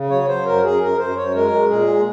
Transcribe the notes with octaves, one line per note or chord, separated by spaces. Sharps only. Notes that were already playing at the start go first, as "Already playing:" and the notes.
Already playing: C#3
F#3 C#5
F#3 C5
F#2 A#4
F#2 G#4
F#2 A#4
F#2 C5
F#2 C#5
G#3 A#4
G#3
A#2 G#4
G#3